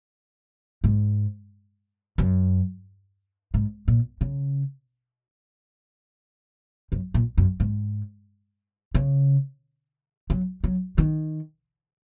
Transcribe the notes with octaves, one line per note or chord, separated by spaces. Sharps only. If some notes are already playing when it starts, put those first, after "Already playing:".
G#2
F#2
G#2
A#2
C#3
F#2
A#2
F#2
G#2
C#3
F#3
F#3
D#3